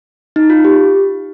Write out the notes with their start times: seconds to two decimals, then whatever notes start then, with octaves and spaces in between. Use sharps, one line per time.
0.36 D#4
0.50 F4
0.65 G4